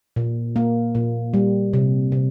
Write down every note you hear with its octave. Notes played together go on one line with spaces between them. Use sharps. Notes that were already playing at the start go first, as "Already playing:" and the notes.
A#2
A#3
A#2
G3
C3
C3